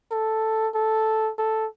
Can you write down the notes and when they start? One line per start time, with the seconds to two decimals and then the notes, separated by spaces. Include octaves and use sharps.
0.11 A4
0.74 A4
1.38 A4